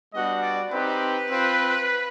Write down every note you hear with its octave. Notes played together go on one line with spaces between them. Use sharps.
G3 B3 D4 F#4 D#5
D5
C4 D#4 G4 B4
C4 F4